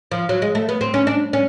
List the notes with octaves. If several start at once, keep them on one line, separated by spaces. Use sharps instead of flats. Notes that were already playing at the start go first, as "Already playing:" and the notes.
F3
F#3
G#3
A3
B3
C4
C#4
D4
C#4